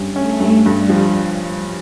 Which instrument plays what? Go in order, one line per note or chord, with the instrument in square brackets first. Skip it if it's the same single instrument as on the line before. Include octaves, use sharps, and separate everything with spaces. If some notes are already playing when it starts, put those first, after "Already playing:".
Already playing: [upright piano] G2 C#4
[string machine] A3 [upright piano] C#4
[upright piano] G2
[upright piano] G2 [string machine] G3
[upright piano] F3